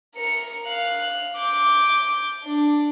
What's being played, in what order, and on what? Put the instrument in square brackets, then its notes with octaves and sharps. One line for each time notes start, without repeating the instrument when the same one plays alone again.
[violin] A#4 C#7
F5 F#6
D6 G6
D4